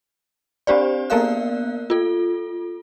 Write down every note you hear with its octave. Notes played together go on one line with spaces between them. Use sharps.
C4 D4 G4 C5 D5
A#3 B3 A#4 D5 F5 F#6
F4 A4